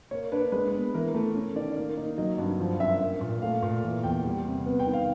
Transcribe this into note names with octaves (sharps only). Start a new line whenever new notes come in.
A#3 C#5
D4 B4
G#3 B4
B3
E3 A#4
A3
C#4
D#3 D5
A#3
D#4
F#3 D#5
G2
F3
F#2 E5
A#3
A#2
A3 F5
A#2
E3
E2 G5
G3
C3
B3
G5
D#3
F5